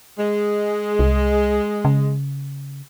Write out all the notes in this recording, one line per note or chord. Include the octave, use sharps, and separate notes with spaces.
G#3
C2
C#3